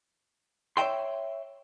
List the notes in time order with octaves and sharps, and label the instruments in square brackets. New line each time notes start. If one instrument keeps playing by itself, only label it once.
[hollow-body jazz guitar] C#5 D#5 E5 G5 C6